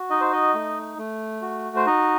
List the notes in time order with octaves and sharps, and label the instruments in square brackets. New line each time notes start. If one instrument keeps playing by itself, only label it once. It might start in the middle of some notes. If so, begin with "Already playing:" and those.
Already playing: [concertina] F#4
D#4 D#5
C5
D#5
A3
A3
F#4
C5
D#4 D#5